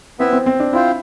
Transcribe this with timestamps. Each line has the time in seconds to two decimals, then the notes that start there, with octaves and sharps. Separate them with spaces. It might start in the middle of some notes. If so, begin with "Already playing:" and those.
0.19 B3 C4 E4 B4 E5
0.33 C4
0.46 C4
0.60 D4
0.73 C4 E4 F4 C5